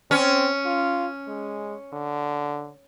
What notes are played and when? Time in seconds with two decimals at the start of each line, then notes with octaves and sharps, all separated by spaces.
0.11 C4 C#4
0.65 F4
1.28 G#3
1.93 D3